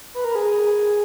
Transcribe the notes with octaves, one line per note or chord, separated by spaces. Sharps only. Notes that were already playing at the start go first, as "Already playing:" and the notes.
B4
A#4
G#4